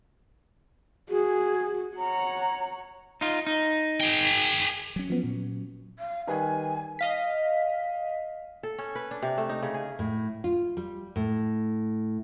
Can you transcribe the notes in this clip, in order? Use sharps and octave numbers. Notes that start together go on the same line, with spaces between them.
F#4 G#4
C#5 F#5 A#5
D#4 F4
D#4
G#4 G5
F#3 C#4
F3 B3
A#2
F5
D#3 G3 B4 G#5
D#5 F5 B6
A4
C#4
B4
D4
C3
A3
D#4
C#3
G#4
A2
F4
G3
A2